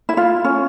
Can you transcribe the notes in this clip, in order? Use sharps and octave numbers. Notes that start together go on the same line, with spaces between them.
E4
F4
C#4